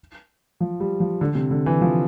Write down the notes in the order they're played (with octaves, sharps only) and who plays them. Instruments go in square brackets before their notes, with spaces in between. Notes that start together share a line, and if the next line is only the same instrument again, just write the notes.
[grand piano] F3
G3
F3
D3
C3
D3
E3
F3